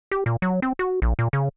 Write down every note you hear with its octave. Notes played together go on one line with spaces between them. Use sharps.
G4
A#2
F#3
C4
F#4
A#1
A#2
C#3